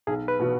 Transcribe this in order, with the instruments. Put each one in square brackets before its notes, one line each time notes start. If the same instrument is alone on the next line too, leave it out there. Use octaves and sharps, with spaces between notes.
[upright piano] B1 [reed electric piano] G#4
[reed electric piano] B4
[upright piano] B2 B3 F#4